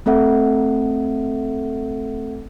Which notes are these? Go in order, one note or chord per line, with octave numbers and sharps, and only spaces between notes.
A3 C4 A4 E5 F#5